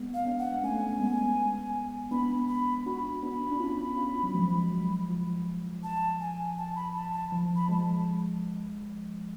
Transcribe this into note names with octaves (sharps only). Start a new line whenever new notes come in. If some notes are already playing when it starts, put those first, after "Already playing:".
Already playing: G#3 B3
F5
B3 D4
F#5
A3 C#4 G#5
G#3 B3
B3 D4 B5
B5
D4 F#4 B5
B3 D4
D4
C#4 F4
C#4 F4
F#3
F3 G#3
F#3
F3
A5
G#5
A5
B5
A5
A5
F3
B5
F3 G#3 A5